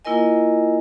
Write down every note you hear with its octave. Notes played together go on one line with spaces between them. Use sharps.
A#3 E4 F4 A#4 D#5 G#5